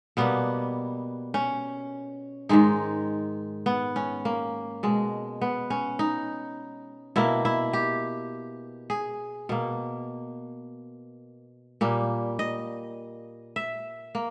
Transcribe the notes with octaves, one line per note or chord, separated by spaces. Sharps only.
B2 G3 A#3 B3
C#4
G#2 D#3 G#3 D#4
B3
C#4
A#3
B2 G#3
B3
C#4
D#4
B2 A#3 E4
E4
G4
G#4
B2 A#3
A#2 G3 A#3
D#5
E5
A#3